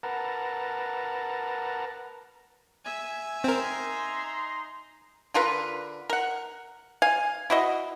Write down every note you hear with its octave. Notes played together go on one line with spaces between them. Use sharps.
A#4 B4 F#5 A5 A#5
E5 G#5
C4 D#4 A#4 A#5 C6
D3 F4 A#4 B4
A#4 F#5
F5 G#5
E4 F#4 D#5